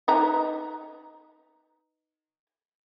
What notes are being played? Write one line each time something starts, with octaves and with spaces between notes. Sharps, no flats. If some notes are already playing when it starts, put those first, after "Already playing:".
D#4 B4 A#5